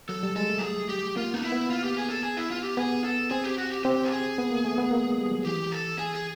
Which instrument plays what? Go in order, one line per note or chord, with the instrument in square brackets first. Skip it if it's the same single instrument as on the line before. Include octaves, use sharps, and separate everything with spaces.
[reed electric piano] F#3 [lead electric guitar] A4
[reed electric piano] G3
[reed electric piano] G#3 [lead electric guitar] A4
[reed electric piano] A3
[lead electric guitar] G4
G#4
G4
[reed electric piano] A#3 [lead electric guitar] F4
[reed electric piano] B3 [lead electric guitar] D#4
[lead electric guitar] E4
[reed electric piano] B3
[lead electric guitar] F4
G4
G#4
A4
G#4
E4
F4
G4
[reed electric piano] B3 [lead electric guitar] G#4
[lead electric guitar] A4
[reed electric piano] C4 [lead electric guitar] G#4
[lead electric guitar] G4
F#4
G4
[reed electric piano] C4 [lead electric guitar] G4
[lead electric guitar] A4
G#4
[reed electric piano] B3
A#3
A3
B3
A#3
G#3
G3
F#3
[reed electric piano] E3 [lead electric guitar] G4
[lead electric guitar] A4
G#4
G#4